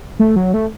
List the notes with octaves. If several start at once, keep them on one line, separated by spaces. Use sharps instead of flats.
A3
F#3
A3